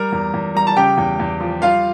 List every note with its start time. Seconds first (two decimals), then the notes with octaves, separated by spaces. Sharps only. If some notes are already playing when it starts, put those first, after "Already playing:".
Already playing: G3 A#4 A#5
0.12 E2
0.33 E2
0.55 G3 A#5
0.67 A5
0.77 C#3 G4 G5
0.97 E2
1.19 E2
1.40 F3
1.62 G3 F4 F5